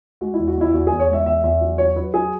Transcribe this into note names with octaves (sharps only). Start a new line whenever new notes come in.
G#3 F#4
E2 E4
F#4
E2 E4
E2 F#4
E2 G#4
C#5
G#3 E5
E2 E5
E2 E5
F#3
F#3 C#5
F#3 B4
F#3 G#4